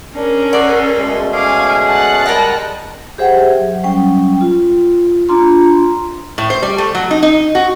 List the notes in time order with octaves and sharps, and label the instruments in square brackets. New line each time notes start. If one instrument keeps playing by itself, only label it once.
[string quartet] C#4 G#4 A#4 [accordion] D4
[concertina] A4 C6 [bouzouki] D5 [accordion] F#5 C#6 E6
[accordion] B2 G#3 A3
[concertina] C#4 G#4 [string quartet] F5 G#5 D6
[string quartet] F#5 A5 F#6
[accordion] G3 G#3 [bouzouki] A#4 D#5 [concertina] G5
[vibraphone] G4 G#4 C5 E5 F#5 G5
F#3
F#3 G3 C#4 G5
F4
D4 F4 A#5 C6
[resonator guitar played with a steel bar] A2
C5
G3
A3
F#3
D#4
D#4
F#4